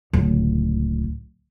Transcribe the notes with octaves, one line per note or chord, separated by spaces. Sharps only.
D1 C#2